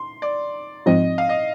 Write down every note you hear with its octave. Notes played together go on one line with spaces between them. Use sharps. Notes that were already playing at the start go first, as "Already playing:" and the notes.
Already playing: C6
D5
G#2 F3 C4 D#4 D#5
F5
D#5